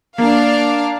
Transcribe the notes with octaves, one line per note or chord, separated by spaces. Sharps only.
A#3 D4 D5 F5